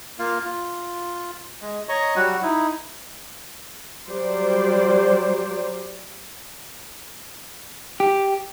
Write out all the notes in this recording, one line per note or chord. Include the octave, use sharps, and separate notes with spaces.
A#3 F4 F5
F4
G#3
C#5 D#5 A#5 C#6
F#3 G3 F#4 F#5
D#4 E4
F#3 G3 C5 D5
G4